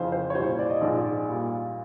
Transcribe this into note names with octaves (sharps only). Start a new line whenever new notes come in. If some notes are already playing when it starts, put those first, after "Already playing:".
Already playing: F2 C#3 E3 C5
C5
C#5
C2 A#2 G3 C5
D5
D#5
A#1 G#2 F3 G#3 D5
A#2 G3